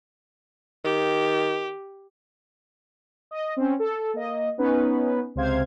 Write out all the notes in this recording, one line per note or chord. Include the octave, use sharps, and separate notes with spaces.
D#3 G4
D#5
C4 C#4
A4
A#3 D#5
B3 C#4 D#4 B4
C#2 C3 C5 F5 G#6